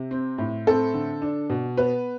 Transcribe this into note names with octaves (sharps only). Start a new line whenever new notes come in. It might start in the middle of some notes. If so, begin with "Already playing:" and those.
Already playing: C3
C4
A2
C4 A4
D3
D4
B2
B3 B4